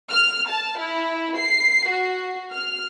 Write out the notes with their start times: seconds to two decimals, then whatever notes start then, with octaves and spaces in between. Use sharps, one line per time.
0.12 F6
0.49 A5
0.79 E4
1.38 C7
1.89 F#4
2.52 F6